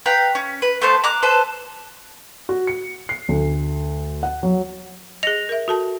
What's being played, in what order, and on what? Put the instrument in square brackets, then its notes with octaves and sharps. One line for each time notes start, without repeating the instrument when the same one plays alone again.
[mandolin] B4 F5 G5 A#5
C#4
B4
A3 B3 C5 A5
A#5 D6 F#6
A4 B4 C5 A5
[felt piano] F#4
C#7
C7
D2
F#5
F#3
[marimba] G#4 D#5 [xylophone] A#6 F7
[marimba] A#4 E5
F#4 A4 A5